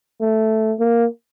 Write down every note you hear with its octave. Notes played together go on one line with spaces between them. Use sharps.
A3
A#3